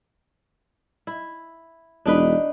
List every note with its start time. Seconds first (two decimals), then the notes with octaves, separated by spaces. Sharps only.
1.07 E4
2.06 E1 D4 D#4 B4